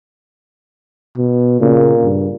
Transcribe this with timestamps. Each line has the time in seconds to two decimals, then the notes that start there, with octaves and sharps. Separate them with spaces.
1.17 B2
1.61 A#2 C#3
2.03 G2